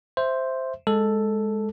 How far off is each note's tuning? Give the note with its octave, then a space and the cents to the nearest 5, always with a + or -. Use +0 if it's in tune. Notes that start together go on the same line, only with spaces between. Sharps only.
C5 +0 E5 +0
G#3 +0 A4 +0